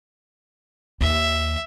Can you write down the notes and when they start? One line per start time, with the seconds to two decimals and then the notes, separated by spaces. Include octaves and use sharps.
1.01 D#2 E5